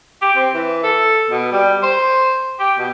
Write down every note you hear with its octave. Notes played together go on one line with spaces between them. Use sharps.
G4
C4
E3
A4
B2
G3
C5
G4
B2